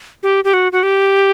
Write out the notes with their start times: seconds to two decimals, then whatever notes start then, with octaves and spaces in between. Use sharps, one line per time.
0.23 G4
0.44 G4
0.54 F#4
0.72 F#4
0.83 G4